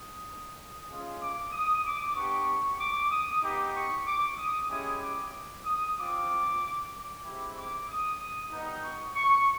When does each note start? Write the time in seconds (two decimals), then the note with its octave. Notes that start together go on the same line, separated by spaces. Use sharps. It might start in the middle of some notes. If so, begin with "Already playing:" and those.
Already playing: D#6
0.87 G#3 C#4 F4
1.19 D6
1.51 D#6
1.83 D6
2.15 B3 D4 G4 C#6
2.79 D6
3.10 D#6
3.42 B3 D#4 G4 D6
3.74 C#6
4.06 D6
4.37 D#6
4.69 G#3 C#4 E4 G4 D#6
5.01 D6
5.64 D#6
5.97 C4 F4 D6
6.92 D6
7.24 G#3 C4 E4 G4
7.55 D6
7.88 D#6
8.51 G3 B3 D#4
8.83 C#6
9.15 C#6